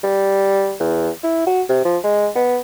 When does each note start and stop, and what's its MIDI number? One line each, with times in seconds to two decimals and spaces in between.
0.04 0.74 55
0.80 1.10 40
1.24 1.43 64
1.47 1.62 66
1.69 1.80 48
1.85 1.98 53
2.04 2.29 56
2.36 2.59 59